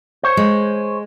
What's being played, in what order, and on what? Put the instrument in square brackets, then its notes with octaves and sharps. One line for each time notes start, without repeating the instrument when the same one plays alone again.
[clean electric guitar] C5 C#5
[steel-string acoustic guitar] G#3